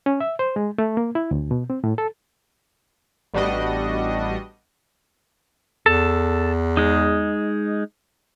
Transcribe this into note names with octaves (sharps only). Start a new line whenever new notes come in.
C#4
E5
C5
G#3
A3
A#3
E4
D2
B2
C4
A2
A4
A1 G3 B3 D4 F#4 D#5
E2 A4 A5
G#3 D#4